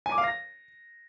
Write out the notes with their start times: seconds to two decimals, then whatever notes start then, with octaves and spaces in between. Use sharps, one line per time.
0.06 G#5
0.12 D6
0.18 F5
0.24 A#6